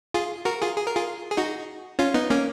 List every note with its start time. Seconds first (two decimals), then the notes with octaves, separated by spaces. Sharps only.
0.14 F4 G#4
0.45 F#4 A#4
0.62 F4 G#4
0.77 G#4
0.87 A#4
0.96 F4 G#4
1.31 G#4
1.37 D#4 F#4
1.99 C#4 F4
2.14 B3 D#4
2.30 A#3 C#4